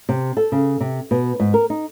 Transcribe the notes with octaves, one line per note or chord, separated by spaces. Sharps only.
C3
A4
C#3
C3
B2
G#2
A#4
D#4